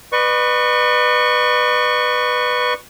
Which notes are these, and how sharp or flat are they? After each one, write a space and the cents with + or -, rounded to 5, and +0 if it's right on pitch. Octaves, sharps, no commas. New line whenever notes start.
B4 +0 D5 +45 C#6 +0